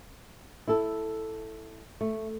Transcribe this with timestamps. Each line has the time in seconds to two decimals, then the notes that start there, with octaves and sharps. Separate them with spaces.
0.68 E4 A4
2.01 A3